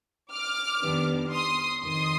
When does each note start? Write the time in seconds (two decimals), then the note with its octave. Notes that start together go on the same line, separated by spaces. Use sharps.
0.32 D6 F6
0.82 F2 D#3 G3 B3 D4
1.32 C6 D#6
1.82 F2 C3 D#3 C6 D#6